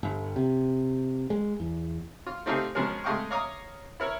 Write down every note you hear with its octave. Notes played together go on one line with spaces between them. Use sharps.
G1
C3
G#3
E2
F4
A3 C4 D#4 F4 G4 G#4
B2 F3 G#3 C#4 G#4 A#4
G#3 A3 D#5 F5 G5 C#6
C#5 D#5 F5 A#5 D6 D#6
E4 A#4 C#5